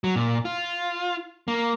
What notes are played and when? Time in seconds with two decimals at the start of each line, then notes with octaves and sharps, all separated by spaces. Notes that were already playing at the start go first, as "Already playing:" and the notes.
0.04 F#3
0.16 A#2
0.45 F4
1.48 A#3